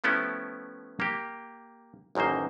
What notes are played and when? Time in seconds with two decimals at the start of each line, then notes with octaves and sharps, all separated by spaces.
0.04 F3 A3 B3 C#4 E4 G4
1.00 A#3 G4
2.15 A1 F#2 D#3 A#3 C5